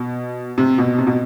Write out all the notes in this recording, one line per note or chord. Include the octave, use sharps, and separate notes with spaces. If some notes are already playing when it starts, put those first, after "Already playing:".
Already playing: B2
C3
B2
C3
B2